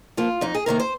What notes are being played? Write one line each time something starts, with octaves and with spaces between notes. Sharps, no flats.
F3 A#3 F4
F2 D#4
G#4
C3 D#3 A#3 A#4
C5